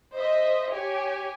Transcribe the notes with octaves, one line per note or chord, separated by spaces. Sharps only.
C5 D#5 E5
G4 C#5 G#5